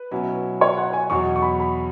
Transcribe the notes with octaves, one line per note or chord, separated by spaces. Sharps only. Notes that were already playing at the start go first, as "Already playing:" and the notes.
Already playing: B4
B2 F#3 C#4 E4
C#5
F#5
G#5
E2 B2 F#3 C#6
C#6
B5
B5